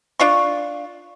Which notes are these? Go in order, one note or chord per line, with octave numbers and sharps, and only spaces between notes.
D4 F4 C#6